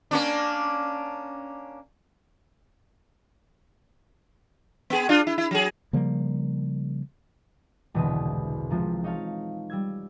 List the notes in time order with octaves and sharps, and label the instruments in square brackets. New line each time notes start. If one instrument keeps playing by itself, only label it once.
[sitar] A#3 C#4 D4
B3 G#4
D4 F4
E4
E4
F#3 G#4
[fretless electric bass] C#3 F3 G3 A#3
[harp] E1 C2 B2 D3 B5 D#6
C3 F3 G#3
D#4 C#5 F5 A5
G3 E6 G#6